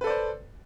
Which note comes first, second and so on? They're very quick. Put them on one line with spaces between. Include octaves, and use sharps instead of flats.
B4 A4 D5 C5